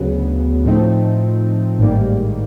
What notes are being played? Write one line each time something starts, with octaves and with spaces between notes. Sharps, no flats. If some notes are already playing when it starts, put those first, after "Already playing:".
Already playing: D2 C#3 F#3 B3
A2 F3 A3 C4 D#4
A1 G#2 D#3 G3 A#3